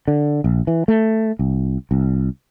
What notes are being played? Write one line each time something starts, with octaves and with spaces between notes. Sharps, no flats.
D3
A#1
E3
A3
C2
C2